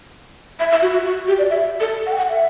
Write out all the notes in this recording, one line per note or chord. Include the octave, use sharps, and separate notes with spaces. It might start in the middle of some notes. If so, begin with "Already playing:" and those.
E5
E5
F#4
F#4
F#4
G4
D5
E5
A4
F#5
G5
F#5
E5